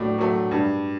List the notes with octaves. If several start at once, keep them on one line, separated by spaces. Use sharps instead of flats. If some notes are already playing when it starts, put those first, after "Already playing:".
Already playing: A2 F#3 A3 D5
F#3 A3
G2